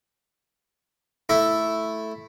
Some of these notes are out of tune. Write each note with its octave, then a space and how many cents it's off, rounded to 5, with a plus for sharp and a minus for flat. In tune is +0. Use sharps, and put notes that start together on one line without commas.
A3 +0 E4 +0